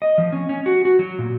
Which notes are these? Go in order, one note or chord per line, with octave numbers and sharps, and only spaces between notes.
D#5
F3
C#4
C#4
F#4
F#4
F#3
A#2